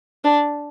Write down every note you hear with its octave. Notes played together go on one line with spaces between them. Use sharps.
D4